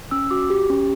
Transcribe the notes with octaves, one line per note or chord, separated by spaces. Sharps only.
C#4 E6
F#4 D6
G4
C#4